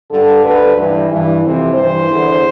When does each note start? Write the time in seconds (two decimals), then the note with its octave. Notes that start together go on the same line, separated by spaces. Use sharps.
0.10 G2 D3 A4
0.43 D2 D3 B4
0.76 G2 E3
1.09 G2 E3
1.42 F2 C3 E3
1.74 G2 C5
1.80 E3
2.07 E2 D3